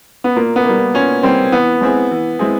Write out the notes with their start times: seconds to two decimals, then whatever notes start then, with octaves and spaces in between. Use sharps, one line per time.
0.24 B3
0.36 A#2 A#3
0.56 B3
0.65 G3 A#3
0.94 A#2 C#4
1.23 G3 A#3 C4
1.52 E3 B3
1.81 G#3 C4 E4 G#4
2.11 E3
2.39 G#3 C4 E4 G#4